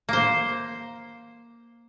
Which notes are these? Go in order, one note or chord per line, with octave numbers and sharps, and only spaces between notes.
A#3 C5